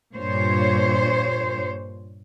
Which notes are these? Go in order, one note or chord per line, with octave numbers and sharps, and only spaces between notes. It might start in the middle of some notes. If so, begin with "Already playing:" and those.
G2 A#2 C5 C#5